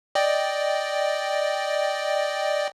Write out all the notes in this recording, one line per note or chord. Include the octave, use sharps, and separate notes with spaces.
D5 D#5 G5